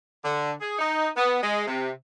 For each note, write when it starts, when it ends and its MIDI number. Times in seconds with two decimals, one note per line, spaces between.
0.24 0.51 50
0.60 0.76 68
0.79 1.08 63
1.16 1.38 59
1.41 1.64 56
1.66 1.90 48